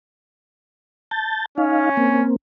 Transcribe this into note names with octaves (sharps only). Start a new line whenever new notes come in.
A5 G6 A6
C#4 D#4 F5
A#3 C4